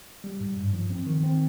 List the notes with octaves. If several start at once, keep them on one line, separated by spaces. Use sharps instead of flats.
G3
G#2
G2
F3
C4
D#3
C4